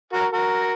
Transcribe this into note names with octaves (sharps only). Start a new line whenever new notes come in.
F#4 A#4
F#4 A#4